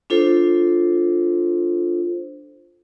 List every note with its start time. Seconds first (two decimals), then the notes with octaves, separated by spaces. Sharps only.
0.10 D4 F4 A4 C5